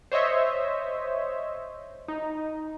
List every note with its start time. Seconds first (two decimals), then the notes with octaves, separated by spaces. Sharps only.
0.12 C5 C#5 D#5 E5
2.08 D#4